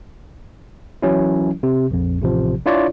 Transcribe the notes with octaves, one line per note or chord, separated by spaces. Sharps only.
E3 F#3 C#4 E4
C3
A#1 F2
A1 C3 F3
D4 E4 F4 C#5 D5